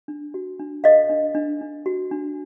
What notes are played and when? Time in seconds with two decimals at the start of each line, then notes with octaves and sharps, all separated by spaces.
0.08 D4
0.34 F#4
0.59 D4
0.84 A4 D#5 F5
1.09 D4
1.35 D4
1.61 D4
1.86 F#4
2.11 D4